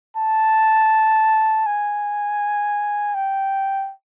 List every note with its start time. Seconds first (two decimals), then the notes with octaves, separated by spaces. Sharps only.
0.17 A5
1.66 G#5
3.14 G5